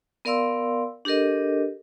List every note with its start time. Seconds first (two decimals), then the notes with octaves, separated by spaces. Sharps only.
0.25 B3 A#4 D5 F5 C6 E6
1.05 D4 G4 A4 A#4 D#5